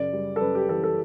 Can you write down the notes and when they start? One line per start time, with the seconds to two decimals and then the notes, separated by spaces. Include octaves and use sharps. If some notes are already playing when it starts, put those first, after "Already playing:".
Already playing: F#2 C#3 D5
0.13 G3
0.36 A4
0.41 F#2 B4
0.55 G4
0.69 E3 A4
0.84 A4